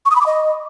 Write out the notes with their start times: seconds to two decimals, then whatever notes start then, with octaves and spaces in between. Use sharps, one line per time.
0.05 C#6
0.11 D#6
0.16 B5
0.21 D6
0.26 D#5